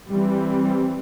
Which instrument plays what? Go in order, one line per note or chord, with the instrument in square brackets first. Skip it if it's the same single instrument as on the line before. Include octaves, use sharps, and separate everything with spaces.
[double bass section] E3 G3 C4